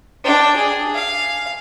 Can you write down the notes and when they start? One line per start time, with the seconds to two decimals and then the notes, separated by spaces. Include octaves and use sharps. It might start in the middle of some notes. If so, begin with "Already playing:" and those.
0.24 D4 G5
0.57 G#4
0.95 F5